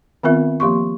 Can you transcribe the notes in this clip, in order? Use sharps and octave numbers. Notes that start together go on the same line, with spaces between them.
D#3 B3 C4 F4 A#4 E5
F3 A#3 G4 C6 C#6